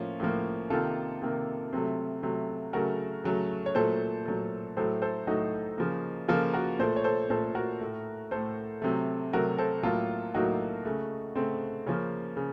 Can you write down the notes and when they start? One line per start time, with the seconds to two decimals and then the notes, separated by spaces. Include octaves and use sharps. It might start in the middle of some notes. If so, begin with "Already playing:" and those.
Already playing: A2 F3 A#3 C#4 F4
0.20 A2 F3 A#3
0.70 C3 D#3 A#3 F4 A4
1.22 C3 D#3 A#3
1.73 C3 F#3 A3
2.23 C3 F#3 A3
2.73 C#3 F#3 A3 F#4 A#4
3.24 C#3 F#3 A3
3.66 C#5
3.75 A#2 F#3 A3 A4 C5
4.26 A#2 F#3 A3
4.77 A2 F#3 A3 A4 C5
5.02 A4 C5
5.27 A2 F#3 A3 D#4 F#4
5.78 C#3 F3 A#3
6.28 C#3 F3 A#3 F4 A4
6.53 F#4 A#4
6.79 A#2 A3 A4 C5
6.96 C#5
7.04 A4 C5
7.30 A#2 A3 A4 C5
7.55 F#4 A#4
7.81 A2 A3
8.31 A2 A3 A4 C5
8.82 C3 F#3 A3
9.33 C3 F#3 A3 F#4 A#4
9.58 A4 C5
9.83 A2 F#3 A#3 F4 A4
10.34 A2 F#3 A#3 D#4 F#4
10.85 C#3 A3
11.36 C#3 A3 C4
11.86 C#3 F3 A#3 C#4
12.37 C#3